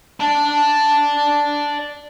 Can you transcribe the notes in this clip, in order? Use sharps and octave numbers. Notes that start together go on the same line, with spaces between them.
D5 A5